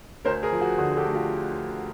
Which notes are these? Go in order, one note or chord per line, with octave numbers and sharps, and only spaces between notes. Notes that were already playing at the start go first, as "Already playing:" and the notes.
D2 A#4 C5
G#4 A#4
F3
F#4 G#4
D3 F#4 G#4
G4 A4
A3
F4 G4